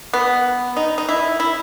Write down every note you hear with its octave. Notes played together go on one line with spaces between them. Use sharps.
B3
D#4
D#4
E4
E4